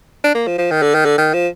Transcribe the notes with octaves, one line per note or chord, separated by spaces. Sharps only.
D4
A#3
F3
F3
D#3
D3
D#3
D3
D#3
F3